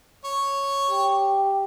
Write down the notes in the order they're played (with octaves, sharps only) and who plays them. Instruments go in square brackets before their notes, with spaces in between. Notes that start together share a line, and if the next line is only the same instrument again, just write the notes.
[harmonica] C#5
[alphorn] G4